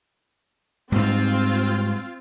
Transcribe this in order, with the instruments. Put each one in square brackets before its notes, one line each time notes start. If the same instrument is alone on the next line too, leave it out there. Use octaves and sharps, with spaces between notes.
[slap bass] G#2 G3 [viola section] C4 F4